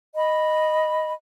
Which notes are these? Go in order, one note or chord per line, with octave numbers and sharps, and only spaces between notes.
D#5 B5